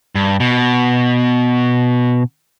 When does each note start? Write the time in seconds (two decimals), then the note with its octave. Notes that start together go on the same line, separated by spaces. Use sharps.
0.15 G2
0.40 B2